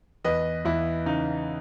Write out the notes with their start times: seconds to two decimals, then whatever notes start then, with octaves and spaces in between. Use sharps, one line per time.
0.24 E2 B4 D#5
0.65 E2 E4
1.06 C#3 D#4